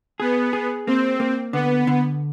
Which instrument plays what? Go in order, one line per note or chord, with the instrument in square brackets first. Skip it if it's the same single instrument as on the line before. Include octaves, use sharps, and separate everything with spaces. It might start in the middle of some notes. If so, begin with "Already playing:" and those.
[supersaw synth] B3 [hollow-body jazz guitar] G#4
[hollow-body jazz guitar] G#4
[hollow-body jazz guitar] A#3 [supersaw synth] C4
[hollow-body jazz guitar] A#3
[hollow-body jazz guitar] D3 [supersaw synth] B3
[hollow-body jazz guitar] D3